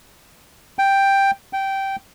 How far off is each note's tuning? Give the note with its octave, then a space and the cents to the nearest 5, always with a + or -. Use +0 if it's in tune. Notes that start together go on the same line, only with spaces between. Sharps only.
G5 +5
G5 -10